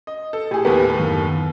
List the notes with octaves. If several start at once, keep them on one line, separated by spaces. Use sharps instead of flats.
D#5
A4
A2 G4 G#4
D#2 A2 B3 G4 A#4 B4
F#2 D#3